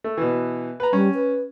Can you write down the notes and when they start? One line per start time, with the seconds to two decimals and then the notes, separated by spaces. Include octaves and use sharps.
0.04 A3
0.17 B2 E3
0.80 B4 A#5
0.93 G3 C#4
1.14 B4